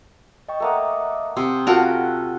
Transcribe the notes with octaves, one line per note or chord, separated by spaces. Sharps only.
D#5 G5 C#6
A3 A#3 D#5 E5 F#5 D#6
C3 C6 D#6 E6
F4 F#4 A4 A#4 F5 F#5 A5